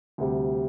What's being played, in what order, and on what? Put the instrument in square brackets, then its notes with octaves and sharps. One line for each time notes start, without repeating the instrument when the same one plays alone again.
[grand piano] D2 C3 G3